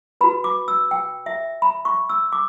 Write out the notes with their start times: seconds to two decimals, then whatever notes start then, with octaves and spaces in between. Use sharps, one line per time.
0.21 F#4 B4 B5
0.44 D6
0.68 E6
0.91 G5
1.26 E5
1.62 B5
1.85 C#6
2.09 E6
2.32 D6